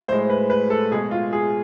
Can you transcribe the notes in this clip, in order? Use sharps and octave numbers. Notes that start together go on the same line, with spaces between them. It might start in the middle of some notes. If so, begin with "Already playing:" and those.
A2 G#3 C5
B4
B4
A4
B2 G#3 G#4
F4
G#4